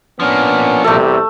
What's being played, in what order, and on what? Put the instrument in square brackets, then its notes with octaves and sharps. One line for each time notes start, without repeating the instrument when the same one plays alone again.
[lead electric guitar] F3 A#3 [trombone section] B3 C#4 D4
[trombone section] E2 C3 G3 [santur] A3 A4